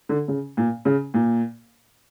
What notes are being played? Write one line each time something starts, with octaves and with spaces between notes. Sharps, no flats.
D3
C#3
A#2
C#3
A#2